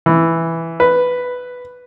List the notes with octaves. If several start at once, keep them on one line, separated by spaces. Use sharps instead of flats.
E3
B4